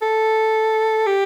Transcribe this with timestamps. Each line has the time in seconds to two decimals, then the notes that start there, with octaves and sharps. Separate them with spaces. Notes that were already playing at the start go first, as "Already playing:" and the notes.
0.02 A4
1.06 G4